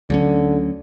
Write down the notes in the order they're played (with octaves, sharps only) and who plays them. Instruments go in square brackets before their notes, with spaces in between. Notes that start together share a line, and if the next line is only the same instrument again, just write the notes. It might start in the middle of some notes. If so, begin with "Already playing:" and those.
[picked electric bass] D2 F#3 C#4 [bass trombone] D3